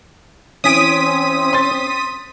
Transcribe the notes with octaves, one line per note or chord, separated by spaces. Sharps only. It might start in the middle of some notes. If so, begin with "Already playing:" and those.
E3 C4 C#4 G#5 D#6 B6 D7 D#7
C6 A6